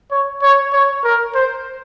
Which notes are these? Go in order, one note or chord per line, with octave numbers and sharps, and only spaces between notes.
C#5
C#5
C#5
A#4
C5